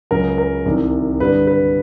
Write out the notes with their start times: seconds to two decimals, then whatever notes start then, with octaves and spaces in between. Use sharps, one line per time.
0.11 C#2 C#3 F#3 A#4
0.38 A#4
0.65 C2 C3 D#3
1.20 G2 D3 G3 B4
1.47 B4